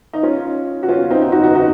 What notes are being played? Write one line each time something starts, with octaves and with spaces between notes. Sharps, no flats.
D#4
C#4 F4
F#4
C#4 F4
C4 D#4
D#4 F#4
D#4 F#4
D#4 F#4
D#4 F#4